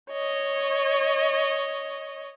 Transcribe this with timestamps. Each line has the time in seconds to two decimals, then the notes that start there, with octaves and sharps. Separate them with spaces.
0.11 C#5 D#5